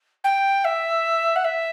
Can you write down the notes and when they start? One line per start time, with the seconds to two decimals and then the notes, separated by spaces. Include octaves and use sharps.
0.24 G5
0.64 E5
1.35 F#5
1.44 E5